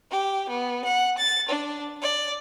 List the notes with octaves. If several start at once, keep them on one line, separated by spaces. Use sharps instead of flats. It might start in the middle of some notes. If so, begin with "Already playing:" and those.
G4
B3
F#5
A6
D4
D5